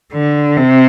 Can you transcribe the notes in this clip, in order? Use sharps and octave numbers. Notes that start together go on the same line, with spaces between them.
D3
C3